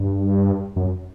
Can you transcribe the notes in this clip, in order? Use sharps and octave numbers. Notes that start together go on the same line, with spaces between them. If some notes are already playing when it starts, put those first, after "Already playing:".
Already playing: G2
F#2